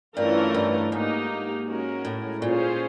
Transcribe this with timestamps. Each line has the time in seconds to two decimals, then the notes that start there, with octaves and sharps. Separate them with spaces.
0.17 G2 E3 A3 C#4 F4 A#4
0.54 G2
0.92 G#2 A#3 D#4 G4
1.66 G#3 C#4 F#4 A#4
2.05 A2
2.41 A#2 C#4 F4 G#4 C5